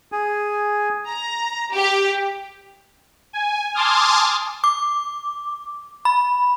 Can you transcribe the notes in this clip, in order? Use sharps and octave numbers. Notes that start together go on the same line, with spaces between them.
G#4 G#5
A#5
G4
G#5
G#5 A5 C6 D6 D#6 F6
D6
B5